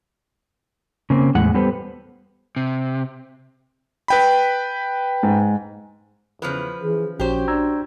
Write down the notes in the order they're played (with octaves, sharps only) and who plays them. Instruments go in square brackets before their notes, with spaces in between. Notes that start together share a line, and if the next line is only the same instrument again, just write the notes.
[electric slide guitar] C#3 A#3 C4
E2 A2 G#3 F#5
G3 B3 G4 A4 B4 C5
[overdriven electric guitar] C3
[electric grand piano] B4 G5 B5
[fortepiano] G#2
[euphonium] E2 [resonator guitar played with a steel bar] C#3 F3 B4
[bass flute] E3 [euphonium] G#4
[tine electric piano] A#1 [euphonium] C#4 [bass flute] F#4 [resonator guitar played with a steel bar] G4 C5
[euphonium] D4 [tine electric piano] A#5 E6 G#6